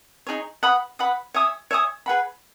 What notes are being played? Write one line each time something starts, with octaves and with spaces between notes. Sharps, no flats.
D#4 G#4 C#5
B4 F#5 B5 D#6
B4 F#5 B5 D#6
C#5 E5 G#5 D#6
C#5 E5 G#5 D#6
G#4 B4 F#5 B5